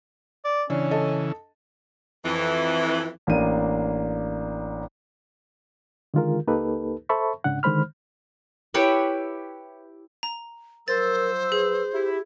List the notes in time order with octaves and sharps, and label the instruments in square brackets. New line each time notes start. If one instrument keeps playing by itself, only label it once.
[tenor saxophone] D5
[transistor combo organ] C#3 E3 [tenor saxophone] C#4 [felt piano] D4
[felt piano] A4 D#5 A5
[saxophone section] F2 E3
[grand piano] A1 A#3 D4 D#7
[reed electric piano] D3 D#3 G#3 F4 G#4 A#4
C#2 A#3 D#4 G4 A4 B4
A4 C5 E5 A5 B5 C#6
G#2 C#3 D4 F#5
D3 D#3 G#3 C5 B5 F6
[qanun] E4 G4 B4 C#5
[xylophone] A#5
[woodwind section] F3 F#3 E6 [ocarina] A#4 [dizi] C5 [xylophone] A6
[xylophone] G#4 [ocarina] B4
[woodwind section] E4 [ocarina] G4